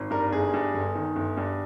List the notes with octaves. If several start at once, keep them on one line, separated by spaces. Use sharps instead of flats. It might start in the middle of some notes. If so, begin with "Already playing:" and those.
Already playing: G#1
G2 A#4
G1 G#4
G2
G1
D#3
G1
G2